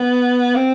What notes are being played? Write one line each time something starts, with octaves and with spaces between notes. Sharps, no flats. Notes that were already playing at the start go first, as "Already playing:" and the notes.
Already playing: B3
C4